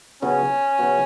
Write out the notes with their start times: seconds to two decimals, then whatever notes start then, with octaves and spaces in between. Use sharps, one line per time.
0.22 C#3 F#3 B3 C#4 F#4
0.79 C#3 F#3 B3 F#4